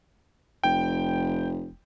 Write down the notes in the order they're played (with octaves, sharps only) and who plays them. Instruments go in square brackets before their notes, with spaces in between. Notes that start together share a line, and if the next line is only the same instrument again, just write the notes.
[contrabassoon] F1 [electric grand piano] G5